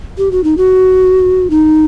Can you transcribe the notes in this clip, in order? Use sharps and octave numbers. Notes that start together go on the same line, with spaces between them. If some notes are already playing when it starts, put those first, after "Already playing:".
G4
F#4
D#4
F#4
D#4